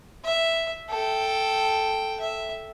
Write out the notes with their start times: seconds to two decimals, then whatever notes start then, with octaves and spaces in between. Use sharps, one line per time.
0.25 E5
0.90 A4 G5
2.20 E5